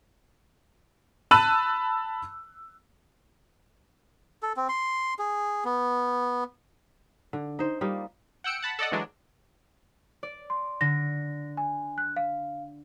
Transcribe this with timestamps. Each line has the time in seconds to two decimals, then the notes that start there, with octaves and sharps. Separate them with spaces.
1.31 A5 B5 E6 F#6 D#7 F#7
4.43 A4
4.57 C4
4.69 C6
5.19 G#4
5.65 B3
7.33 D3
7.59 D#4 C5
7.81 G3 A#3 D#4 F4
8.44 F#5 G5 E6 C#7 D7
8.62 F#5 A5 B5
8.79 A4 D5 D#5 F#5
8.92 D3 E3 F#3 G#3 D4
10.23 D5
10.50 C6
10.81 D3 A#6
11.57 G#5
11.98 F#6
12.16 F5